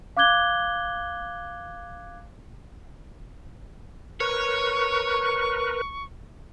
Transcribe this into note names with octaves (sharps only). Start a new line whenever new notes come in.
F5 D6 F#6 G#6 G7
A#4 B4 C#5 C#6